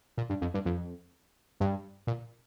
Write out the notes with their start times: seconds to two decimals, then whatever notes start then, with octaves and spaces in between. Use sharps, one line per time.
0.17 A#2
0.30 G2
0.41 F2
0.54 G2
0.65 F2
1.60 G2
2.07 A#2